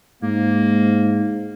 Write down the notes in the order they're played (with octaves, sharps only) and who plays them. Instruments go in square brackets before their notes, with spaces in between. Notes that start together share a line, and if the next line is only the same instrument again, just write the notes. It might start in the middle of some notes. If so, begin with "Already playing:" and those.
[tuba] G#2 [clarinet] A#3